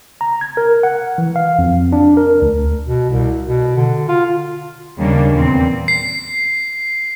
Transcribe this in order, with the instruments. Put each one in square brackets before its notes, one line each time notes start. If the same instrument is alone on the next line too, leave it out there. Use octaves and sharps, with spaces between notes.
[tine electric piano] A#5
G#6
A#4
F#5
E3
F5
F2
D4
A#4
D2
[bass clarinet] B2
C2
B2
D3
F4
[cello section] D#2 C#3 G3 A#3 C#4 D4
E2 A#2 C4
[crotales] C7